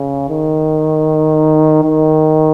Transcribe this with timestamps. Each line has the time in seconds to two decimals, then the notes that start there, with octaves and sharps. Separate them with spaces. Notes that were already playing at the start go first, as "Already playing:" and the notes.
Already playing: C#3
0.29 D#3
1.84 D#3